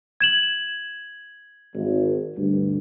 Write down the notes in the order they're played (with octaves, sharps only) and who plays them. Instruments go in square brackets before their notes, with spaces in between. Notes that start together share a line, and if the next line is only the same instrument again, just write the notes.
[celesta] G#6 E7 F#7
[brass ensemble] G#1
D2 G2